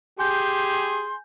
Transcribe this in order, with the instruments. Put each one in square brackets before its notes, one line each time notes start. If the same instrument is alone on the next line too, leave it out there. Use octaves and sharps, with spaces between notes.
[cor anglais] G4 [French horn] G#4 [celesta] G#5 G6 [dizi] C6